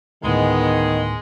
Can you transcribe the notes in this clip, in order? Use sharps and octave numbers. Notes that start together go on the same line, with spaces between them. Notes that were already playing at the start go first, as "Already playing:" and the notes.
D2 A2 D#3 G#3 B3